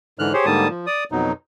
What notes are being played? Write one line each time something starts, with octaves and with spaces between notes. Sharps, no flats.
G#2 D3 E3 F6 F#6
G4 G#4 C5 C#5
G#2 D3 G3 A#3 A5 D#6
F3
D5 D#6
F2 B2 F#3 D#4